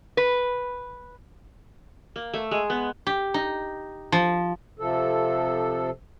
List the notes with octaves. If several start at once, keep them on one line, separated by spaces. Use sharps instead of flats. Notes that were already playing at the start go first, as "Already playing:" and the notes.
B4
A#3
A3
G#3
B3
G4
D#4
F3
C3 F3 A4